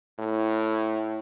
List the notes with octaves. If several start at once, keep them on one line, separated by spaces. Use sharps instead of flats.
A2